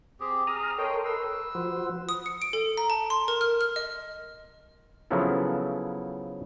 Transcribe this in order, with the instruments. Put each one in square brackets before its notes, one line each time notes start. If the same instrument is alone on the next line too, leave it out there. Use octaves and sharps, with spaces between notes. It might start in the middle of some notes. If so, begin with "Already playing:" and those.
[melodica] C4 G4 G#4
[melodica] G#4 [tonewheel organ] A#5 D#6 F6
[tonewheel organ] A4 A#4 C6 [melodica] C#5 D#5 G5
[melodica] B4 E6
[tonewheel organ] F3 F#4 C5
[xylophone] D#6
C#7
D7
A4
A#5
A5
C6
A#4
F6
F6
D#5
[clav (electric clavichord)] C#3 F3 F#3 B3 E4 A4